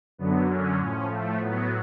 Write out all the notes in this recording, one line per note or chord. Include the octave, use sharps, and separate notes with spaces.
F#2 D3 F#3 B3
C#4
A2 F3 C#4
A3
A2 F#3 B3